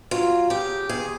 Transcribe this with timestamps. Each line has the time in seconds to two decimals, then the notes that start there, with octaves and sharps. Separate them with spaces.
0.11 F#3 F4
0.50 C#3 G4
0.89 E2 G#4